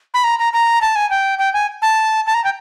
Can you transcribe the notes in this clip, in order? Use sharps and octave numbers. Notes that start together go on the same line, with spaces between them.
B5
A#5
A#5
A#5
A5
G#5
G5
G5
G#5
A5
A5
A#5
G5